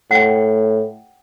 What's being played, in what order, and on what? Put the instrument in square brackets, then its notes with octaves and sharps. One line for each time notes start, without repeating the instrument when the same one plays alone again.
[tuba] A2 [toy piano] F#5 G5